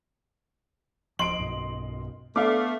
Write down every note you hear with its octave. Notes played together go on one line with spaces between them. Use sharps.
D1 F3 D#5 C6 D7 F#7
B1 G2 B2
A3 B3 D4 F5 D6